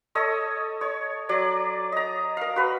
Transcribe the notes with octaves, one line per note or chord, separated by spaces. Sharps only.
A4 C#5 D#5
C#5
F#3 D5
D#5 A#5
A#4 F5
F#4 B4